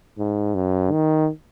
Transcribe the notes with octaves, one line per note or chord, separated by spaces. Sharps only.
G#2
F#2
D#3